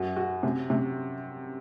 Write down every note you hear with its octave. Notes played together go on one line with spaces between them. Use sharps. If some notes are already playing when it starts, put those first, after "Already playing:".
Already playing: F#2 F#4
F#4
C3
C3